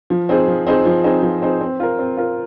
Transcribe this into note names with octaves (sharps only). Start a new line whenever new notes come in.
F3
C4 D#4 G#4 C5
F3
C4 D#4 G#4 C5
F3
C4 D#4 G#4 C5
F3
C4 D#4 G#4 C5
C4
F4 A#4
C4
F4 A#4